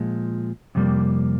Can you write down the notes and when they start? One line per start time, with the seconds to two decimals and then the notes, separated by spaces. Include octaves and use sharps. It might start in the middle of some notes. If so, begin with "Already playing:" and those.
Already playing: A#2 F3 G#3
0.75 F2 C3 G3 A#3